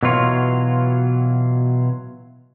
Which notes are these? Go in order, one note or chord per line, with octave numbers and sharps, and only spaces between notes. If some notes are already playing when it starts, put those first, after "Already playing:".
B2 E3 F#3 F4 C#5